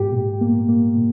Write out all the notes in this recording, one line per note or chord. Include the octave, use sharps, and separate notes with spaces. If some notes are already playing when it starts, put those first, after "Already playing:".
Already playing: G#2 G4
A#2
A#3
A#3
A#2